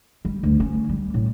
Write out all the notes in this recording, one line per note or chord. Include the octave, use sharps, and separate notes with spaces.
G3
D2
C#4
G3
A2